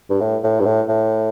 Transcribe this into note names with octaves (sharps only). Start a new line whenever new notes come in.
G2
A2
A2
G2
A2
A2